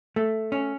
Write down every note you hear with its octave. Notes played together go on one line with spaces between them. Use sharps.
A3
C#4